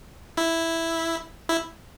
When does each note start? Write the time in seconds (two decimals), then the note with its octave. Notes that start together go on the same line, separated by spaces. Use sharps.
0.37 E4
1.49 E4